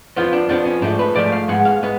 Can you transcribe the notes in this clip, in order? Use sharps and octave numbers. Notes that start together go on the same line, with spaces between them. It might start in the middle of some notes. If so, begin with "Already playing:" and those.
F2 F3 B3 F4
D4
F2 F3 B3 D4
C#4
G#2 F3 A3 D4
B4
G#2 F3 A3 D5
F5
G#2 G#3 B3 F#5
F5
G#3 B3